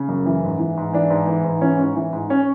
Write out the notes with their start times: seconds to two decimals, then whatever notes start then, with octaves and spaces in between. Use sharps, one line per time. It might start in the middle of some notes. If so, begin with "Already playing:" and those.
Already playing: C#3
0.08 F#2
0.26 E3
0.43 G#2
0.59 E3
0.77 G#2
0.93 E3 D4
1.10 G#2
1.27 E3
1.44 G#2
1.61 E3 C#4
1.79 G#2
1.96 E3
2.13 G#2
2.30 C#4